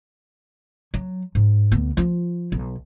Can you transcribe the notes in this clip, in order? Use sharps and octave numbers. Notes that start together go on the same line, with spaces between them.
F#3
G#2
D2 B3
F3 F4
B1